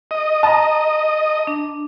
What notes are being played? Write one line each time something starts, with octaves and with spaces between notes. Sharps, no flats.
D#5
A5 A#5
D4